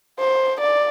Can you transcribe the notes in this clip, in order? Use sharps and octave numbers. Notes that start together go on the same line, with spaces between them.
C5
D5